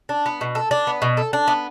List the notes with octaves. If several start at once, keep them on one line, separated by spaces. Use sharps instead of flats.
D4
B3
B2
A4
D4
B3
B2
A4
D4
B3